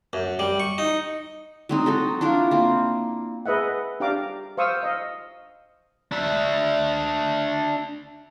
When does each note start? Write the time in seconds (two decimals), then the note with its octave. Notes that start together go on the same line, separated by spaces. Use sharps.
0.13 F#2
0.39 G3
0.60 C#6
0.78 D#4
1.69 F#3 C4 D#4
1.86 D#4 F#4 A4
2.21 D4 E4 F4 A#4
2.51 A#3 C4
3.46 G#4 B4 D#5 E5 F#5
4.00 D4 G4 D5 F5 A#5 D6
4.57 C5 F5 C#6 D#6 E6
4.83 D#5 F5
6.12 D4 E5